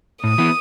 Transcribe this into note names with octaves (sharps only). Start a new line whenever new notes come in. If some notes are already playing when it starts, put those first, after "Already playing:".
A2 D#6
E3 B3 E4